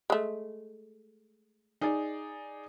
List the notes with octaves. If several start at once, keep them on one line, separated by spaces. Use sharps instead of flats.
G#3 A3
D#4 G#4 D5